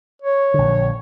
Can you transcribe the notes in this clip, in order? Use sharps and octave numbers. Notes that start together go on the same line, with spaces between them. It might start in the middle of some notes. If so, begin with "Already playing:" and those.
C#5
A#1 D3